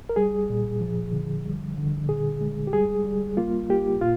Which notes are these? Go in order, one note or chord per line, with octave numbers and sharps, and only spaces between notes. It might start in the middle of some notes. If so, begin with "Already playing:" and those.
A#4
G3 G#4
A#2
F3
D3
G3
D3
A#2 G#4
G#3
G4
G3 G#4
G3
A#3 F4
A#3 G4
A#2 F4